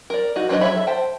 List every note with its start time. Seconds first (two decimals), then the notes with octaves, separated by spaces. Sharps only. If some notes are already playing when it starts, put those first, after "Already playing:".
0.10 A#4 D5
0.36 D#4 F#4
0.49 F3 F#3 D4 B4 D#5
0.61 F#3 F#4 C#5 E5 B5
0.75 A4 E5
0.87 C5 G5 A5